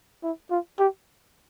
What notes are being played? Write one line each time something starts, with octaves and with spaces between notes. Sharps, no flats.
E4
F4
G4